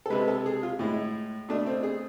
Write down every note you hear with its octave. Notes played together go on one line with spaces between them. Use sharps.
A4
C3 G#3 B4
A4
G#4
F4
A2 G#3 E4
B2 A3 D4
C4
G#4